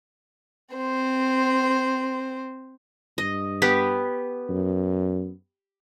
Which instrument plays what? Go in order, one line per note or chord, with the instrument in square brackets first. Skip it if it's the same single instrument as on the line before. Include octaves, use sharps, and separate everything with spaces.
[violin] C4 C5
[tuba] G2 [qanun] D#5
[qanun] B3 G4 B4
[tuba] F#2